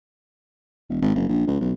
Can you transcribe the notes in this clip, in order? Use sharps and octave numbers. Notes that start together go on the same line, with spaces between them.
E1
G#1
F#1
A#1
C#2
B1